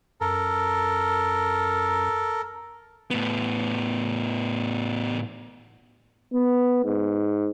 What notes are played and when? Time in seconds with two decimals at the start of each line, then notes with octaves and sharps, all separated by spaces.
0.21 F#2 A4 A#4
3.11 A2 B3
6.34 B3
6.85 G#2